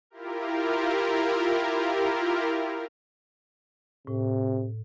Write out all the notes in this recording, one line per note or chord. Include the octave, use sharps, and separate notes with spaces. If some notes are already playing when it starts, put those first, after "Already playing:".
E4 F4 G4 A#4
A2 C3